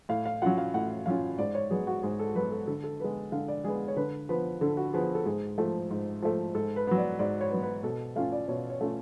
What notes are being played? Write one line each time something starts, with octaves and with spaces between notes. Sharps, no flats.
A2 F5
F5
F#3 C#4 F4 F#5
F5
A2 F#5
F#3 C#4 F4 F5
G#2 D5
C#5
F#3 B3 G#4
F#4
G#2 G#4
A4
F#3 B3 B4
A4
D3 A4
A4
G#3 B3 B4
D3 F5
D5
G#3 B3 G#4
C#5
D3 B4
F3 B3 B4
D3 A4
F#4
F3 B3 G#4
A4
G#2 G#4
F3 A3
G#2
F3 A3
G#2 A4
B4
F#3 B3
D5
G#2 D5
C#5
F#3 B3
B4
B2 A4
A3 C#4 F4 F5
D5
B2 C#5
C#5
A3 C#4 F4